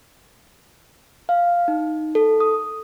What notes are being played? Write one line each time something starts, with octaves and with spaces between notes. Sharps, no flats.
F5
D#4
A4
D#6